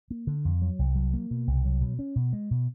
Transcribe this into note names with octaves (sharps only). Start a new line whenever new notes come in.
A#3
D3
F2
F#3
C2
F#3
A#3
B2
C2
F#3
B2
C#4
B2
G#3
B2